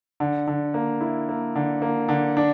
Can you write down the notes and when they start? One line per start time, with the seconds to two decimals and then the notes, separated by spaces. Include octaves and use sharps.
0.20 D3
0.47 D3
0.74 A#3
1.01 E4
1.29 A#3
1.55 D3
1.82 A#3
2.09 D3
2.37 D4